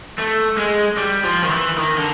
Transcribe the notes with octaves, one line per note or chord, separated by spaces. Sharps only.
A3
G#3
G3
F3
D#3
E3
D#3
D3